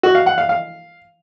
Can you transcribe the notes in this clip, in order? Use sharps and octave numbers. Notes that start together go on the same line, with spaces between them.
F#4
F5
F#5
F5
F5